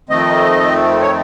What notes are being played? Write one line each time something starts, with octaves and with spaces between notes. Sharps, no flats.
F2 D#3 A3 C4 D#5
C#5